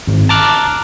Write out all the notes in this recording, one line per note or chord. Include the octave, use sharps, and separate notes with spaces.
G#1
A5 A#5 D6 F6 F#6